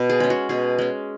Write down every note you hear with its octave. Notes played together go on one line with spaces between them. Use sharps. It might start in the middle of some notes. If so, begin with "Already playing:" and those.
Already playing: B2 B4
G#4
G#3 C#4
F#4
B2 G#4
G#3 C#4